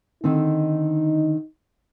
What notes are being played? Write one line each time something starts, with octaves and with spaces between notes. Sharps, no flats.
D3 D#3 C4 D#4